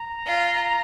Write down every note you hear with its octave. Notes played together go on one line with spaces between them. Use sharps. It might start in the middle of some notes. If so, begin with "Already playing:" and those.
Already playing: A#5
F4